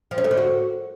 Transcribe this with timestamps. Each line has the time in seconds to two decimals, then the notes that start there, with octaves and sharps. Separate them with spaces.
0.11 F3
0.18 C#4
0.24 A3
0.31 D3
0.37 F#4